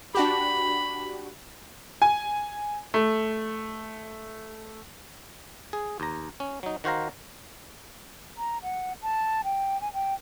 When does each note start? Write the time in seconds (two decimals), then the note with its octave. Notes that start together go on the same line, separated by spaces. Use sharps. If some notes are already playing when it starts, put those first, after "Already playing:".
0.15 D4 F#4 G4 B5
2.02 G#5
2.94 A3
5.73 G#4
6.00 D#2 A#5
6.40 C#4
6.63 F#3 D#4
6.84 D#3 F#4 C5 F5 A#5
8.38 A#5
8.63 F#5
9.02 A5
9.44 G5
9.81 G#5
9.94 G5